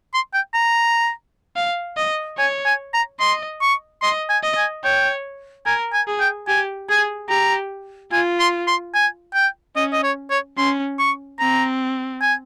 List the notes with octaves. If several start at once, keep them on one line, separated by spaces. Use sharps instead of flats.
C6
G5
A#5
F5
D#5
C#5 G#5
G#5
A#5
D#5 C6
C#6
D#5 C6
G#5
D#5
G#5
C#5 G5
A#4 G#5
G#5
G#4
G5
G4 G#5
G#4 G#5
G4 A#5
F4 G#5
C6
C6
G#5
G5
C#4 D#5
D#5
C#5
C#5
C#4 C6
C#6
C4 A#5
G#5